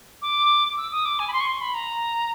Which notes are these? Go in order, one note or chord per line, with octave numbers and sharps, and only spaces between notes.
D6
E6
D#6
D6
G#5
B5
C6
C#6
C6
B5
A#5